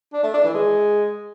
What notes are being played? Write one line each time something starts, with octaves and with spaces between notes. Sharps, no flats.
D4
A3
D4
E3
G#3